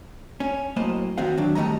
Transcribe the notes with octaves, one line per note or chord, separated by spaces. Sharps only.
C#4
F#2 A2 A#3 C5 D#5
D#3 B3 C4 F#4 F5
D#3 F#3 D4
D#3 G3 A3 D#5 A#5